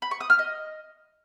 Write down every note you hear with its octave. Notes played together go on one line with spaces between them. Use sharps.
B5
C#6
D#6
F6
D#5